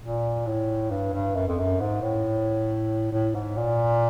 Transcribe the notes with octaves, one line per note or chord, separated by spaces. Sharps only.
A#2
A2
G2
G2
F#2
F2
F#2
G#2
A2
A2
G#2
A#2